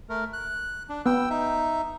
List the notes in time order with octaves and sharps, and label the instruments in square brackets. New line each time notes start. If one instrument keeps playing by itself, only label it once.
[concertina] A3 A#4
F#6
D4
[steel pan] B3 [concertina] G5 E6
[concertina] D#4 E5